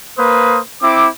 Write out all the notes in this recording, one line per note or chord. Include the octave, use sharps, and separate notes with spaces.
A#3 B4 C5 D#6
C4 E4 D6